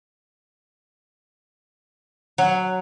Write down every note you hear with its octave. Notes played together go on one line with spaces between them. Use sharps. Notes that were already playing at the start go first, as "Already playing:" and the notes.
F#3